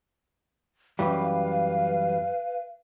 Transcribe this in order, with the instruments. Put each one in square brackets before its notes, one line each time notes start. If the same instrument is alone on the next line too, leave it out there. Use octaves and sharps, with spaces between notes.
[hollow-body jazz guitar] F#2 E3 G3 [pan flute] B4 [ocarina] F5